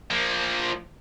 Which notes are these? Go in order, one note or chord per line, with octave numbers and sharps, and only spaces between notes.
F3 A#3